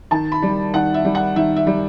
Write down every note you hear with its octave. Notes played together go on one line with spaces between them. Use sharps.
D#3 A5
B5
G3
D#3 F#5
E5
G3
F#5
D#3 E5
E5
G3